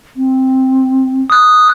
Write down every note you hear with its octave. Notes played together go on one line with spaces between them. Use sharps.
C4
D#6 F#6